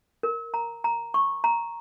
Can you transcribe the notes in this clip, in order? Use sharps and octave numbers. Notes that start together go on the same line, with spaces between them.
A#4
A#5
A#5
C#6
A#5